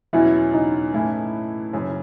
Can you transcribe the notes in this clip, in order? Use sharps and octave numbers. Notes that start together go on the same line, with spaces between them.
E2 B2 F#3 C#4 E4
D#4
A2 E3 A3 C#4 E4
F#1 F#2 C#3